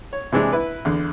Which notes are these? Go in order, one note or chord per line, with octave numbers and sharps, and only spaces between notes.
C#5
C3 E3 G#3 D4
E4 B4
E2 D3